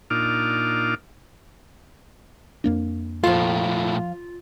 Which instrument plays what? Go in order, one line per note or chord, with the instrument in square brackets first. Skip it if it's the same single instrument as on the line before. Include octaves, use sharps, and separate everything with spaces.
[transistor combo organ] A#2 D4 D#4 F4 D6 F6
[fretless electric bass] F2 A#3 D4
[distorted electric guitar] A#2 A3 [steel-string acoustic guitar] F3 F5 [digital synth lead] F4